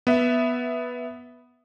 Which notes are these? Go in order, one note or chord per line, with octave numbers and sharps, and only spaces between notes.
B3 E5